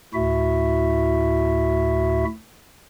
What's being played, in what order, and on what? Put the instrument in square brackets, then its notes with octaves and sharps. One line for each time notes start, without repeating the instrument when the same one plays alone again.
[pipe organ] D2 A2 E4 F#4 E5